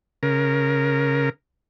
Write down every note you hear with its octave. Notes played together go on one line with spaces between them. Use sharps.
C#3 A#4